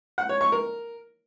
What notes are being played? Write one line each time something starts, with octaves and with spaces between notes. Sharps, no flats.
F#5
C#5
C#6
A#4